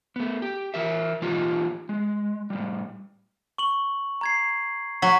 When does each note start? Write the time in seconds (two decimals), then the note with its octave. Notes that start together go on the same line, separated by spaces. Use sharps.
0.16 A3 B3
0.42 G4
0.74 E3 A#4 E5
1.22 E3 A#3 D#4 F4 G4
1.89 G#3
2.50 A2 G3
3.58 C#6 F#7
4.21 A#5 G#6 C7
5.02 F#3 B6